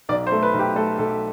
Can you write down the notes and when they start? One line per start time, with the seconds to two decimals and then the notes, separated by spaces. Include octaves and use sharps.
0.09 B1 D5
0.27 C5
0.32 A3
0.43 B4
0.54 B1
0.59 G4
0.76 A3 A4
0.99 B1 A4